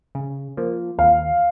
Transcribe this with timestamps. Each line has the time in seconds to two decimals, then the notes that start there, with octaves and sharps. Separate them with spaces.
0.15 C#3
0.57 F3 A#3
0.98 D#2 F5